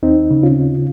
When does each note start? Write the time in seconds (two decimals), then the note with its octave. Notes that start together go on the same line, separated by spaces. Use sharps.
0.03 D#2 C4 D#4
0.31 C#3
0.43 C#4 F4